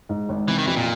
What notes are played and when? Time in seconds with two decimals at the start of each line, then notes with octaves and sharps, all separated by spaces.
0.09 G#2
0.29 G#1
0.48 C3 E3
0.58 D#3
0.67 F2 E3
0.77 A#2